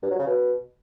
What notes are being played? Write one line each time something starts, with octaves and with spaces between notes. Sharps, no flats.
G2
F#3
C#3
B2